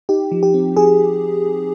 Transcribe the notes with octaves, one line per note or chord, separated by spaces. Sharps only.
D#4 G4
F3
G4
C4
F3 G#4